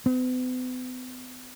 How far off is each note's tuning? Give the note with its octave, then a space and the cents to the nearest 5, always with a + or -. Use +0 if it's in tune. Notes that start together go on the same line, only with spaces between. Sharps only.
B3 +45